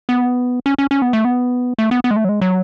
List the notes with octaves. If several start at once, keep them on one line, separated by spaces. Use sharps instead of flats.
B3
C#4
C#4
C#4
B3
A3
B3
A3
B3
B3
G#3
A3
F#3
G#3
F#3